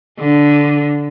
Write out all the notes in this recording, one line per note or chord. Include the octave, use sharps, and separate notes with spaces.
D3